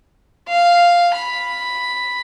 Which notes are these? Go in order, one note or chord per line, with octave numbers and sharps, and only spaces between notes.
F5
B5